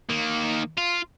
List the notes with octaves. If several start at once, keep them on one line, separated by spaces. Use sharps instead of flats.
D#3 A#3
F4